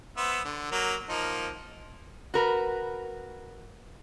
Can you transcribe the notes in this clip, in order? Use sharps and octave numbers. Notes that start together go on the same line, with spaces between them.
B3 C5 E5
D3
F#3 A#3
F3 A#3 D#4
F#4 A#4 B4